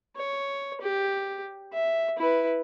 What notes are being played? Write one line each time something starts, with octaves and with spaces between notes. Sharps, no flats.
C#5
G4
E5
E4 B4